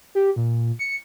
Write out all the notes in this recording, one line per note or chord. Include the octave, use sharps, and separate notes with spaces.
G4
A#2
C#7